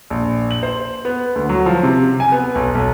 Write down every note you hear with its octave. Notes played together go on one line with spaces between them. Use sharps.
A#1
F#7
C5
B3
D2
F#3
F3
C3
G#5
B3
B1
B1